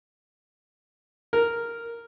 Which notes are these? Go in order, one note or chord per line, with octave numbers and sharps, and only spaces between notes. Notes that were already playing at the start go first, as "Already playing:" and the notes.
A#4